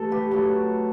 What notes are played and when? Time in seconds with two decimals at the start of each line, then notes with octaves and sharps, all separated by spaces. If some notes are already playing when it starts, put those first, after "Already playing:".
Already playing: G2 E3 A3 A4
0.11 G4 B4
0.31 F#3 A3 F#4 A4